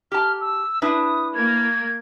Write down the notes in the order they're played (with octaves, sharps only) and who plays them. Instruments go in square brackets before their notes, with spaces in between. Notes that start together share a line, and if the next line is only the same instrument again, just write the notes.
[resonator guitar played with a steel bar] G4 A5 [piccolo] F6
[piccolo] E6
[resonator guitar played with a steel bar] D4 E4 B4 [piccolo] D#6
[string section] A#3 [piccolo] G#6